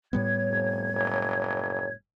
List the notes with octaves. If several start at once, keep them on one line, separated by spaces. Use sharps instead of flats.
A2 G3 B3 C#5 G#6
F1
F#1